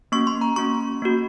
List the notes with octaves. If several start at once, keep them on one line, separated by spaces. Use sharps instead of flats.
A#3 C#4 F#4 C#6
C6
A#5
A#3 C#4 F#4 C#6
A#3 C#4 F#4